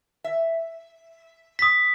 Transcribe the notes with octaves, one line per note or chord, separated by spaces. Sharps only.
E5
D#6 B6